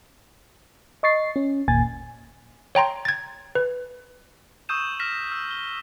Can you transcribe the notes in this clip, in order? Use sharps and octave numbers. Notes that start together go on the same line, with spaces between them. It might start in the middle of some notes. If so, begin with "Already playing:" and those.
D#5 C#6 A6 C7
C#4
G1 D#2 A#2 A#3 G#5 A6
C#5 G5 A#5 C6
G#6 A6
B4
C#6 D#6 E6 G6 D#7 E7
F6 A#6 B6 E7
E6
G7